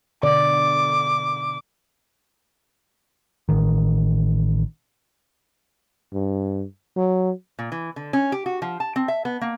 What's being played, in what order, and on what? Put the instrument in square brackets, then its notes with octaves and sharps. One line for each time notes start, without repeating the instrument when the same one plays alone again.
[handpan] B2 D3 D5 [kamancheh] D6
[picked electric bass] A1 D#3
[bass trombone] G2
F#3
[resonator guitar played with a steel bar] A#2
E3
D3
C#4
G4
F#4
F3
A5
C4
E5
B3
A#3